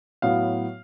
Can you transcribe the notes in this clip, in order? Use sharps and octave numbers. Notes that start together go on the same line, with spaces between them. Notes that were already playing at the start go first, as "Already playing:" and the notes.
A2 F#3 B3 F5